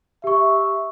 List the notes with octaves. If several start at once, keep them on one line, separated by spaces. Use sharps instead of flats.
G4 E5 C#6